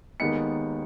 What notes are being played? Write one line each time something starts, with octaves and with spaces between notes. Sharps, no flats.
D#2 D#3 G#3 B3 D#4 C#7